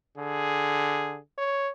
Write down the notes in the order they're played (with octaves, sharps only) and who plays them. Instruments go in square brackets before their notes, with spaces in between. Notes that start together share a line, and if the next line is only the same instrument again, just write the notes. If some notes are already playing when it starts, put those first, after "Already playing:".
[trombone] D3 [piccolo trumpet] G#4
[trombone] C#5